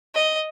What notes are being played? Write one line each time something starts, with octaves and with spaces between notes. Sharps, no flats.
D#5